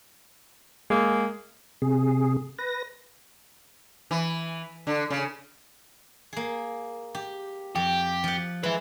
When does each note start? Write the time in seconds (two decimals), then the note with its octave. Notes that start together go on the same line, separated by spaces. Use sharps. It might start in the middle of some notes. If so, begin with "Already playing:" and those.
0.90 G#3 A#3 G#4
1.82 C3 G#4
2.59 B4 A#6
4.11 E3
4.87 D3
5.10 C#3
6.33 A#3 G#4
7.15 G4
7.75 F2 G4
8.24 F3 F#5
8.63 G#3 B4 E5